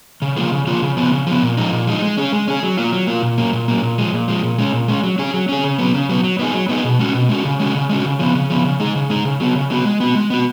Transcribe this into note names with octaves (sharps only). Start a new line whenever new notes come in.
C#3
F3 A#3 F4 G#4
C#3
F3 A#3 F4 G#4
C#3
F3 B3
C#3
F3 B3
A#2
F3 G#3 D#4
A#2
F3 G#3 D#4
G#3
C#4 G#4
G#3
C#4 G#4
F#3
A#3 F4
F#3
A#3 F4
A#2
F#3 A#3
A#2
F#3 A#3
A#2
F3 G#3
A#2
F3 G#3
A#2
G#3 C#4
A#2
G#3 C#4
F#3
C#4 G#4
F#3
C#4 G#4
C#3
F#3 B3
C#3
F#3 B3
F#3
B3 D#4 G#4
F#3
B3 D#4 G#4
B2
G#3 C#4 F#4
B2
G#3 C#4 F#4
C#3
G#3 C#4 F#4
C#3
G#3 C#4 F#4
C#3
F3 B3
C#3
F3 B3
C#3
G#3 D#4 G#4
C#3
G#3 D#4 G#4
C#3
F#3 B3 F#4
C#3
F#3 B3 F#4
G#3
B3 F#4
G#3
B3 F#4